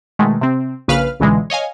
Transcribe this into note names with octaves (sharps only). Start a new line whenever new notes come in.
B2 D#3 G#3 A3
C3 C4
A#1 C#3 B4 F5 F6
C#2 B2 D3 E3 G#3
C#5 D#5 F5 G#5